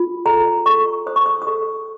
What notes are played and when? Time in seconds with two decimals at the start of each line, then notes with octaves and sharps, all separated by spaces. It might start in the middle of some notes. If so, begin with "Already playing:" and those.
Already playing: F4
0.26 A4 A#5
0.66 A4 C#6
1.06 C5 D#6
1.16 C#6
1.26 D#6
1.42 D#6
1.47 A4 C#6